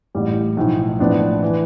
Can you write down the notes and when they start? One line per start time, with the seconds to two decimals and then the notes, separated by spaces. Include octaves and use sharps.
0.15 A1 A2 G3
0.57 B1 A2 F3
0.99 A1 A2 F3 B3 D4
1.42 E3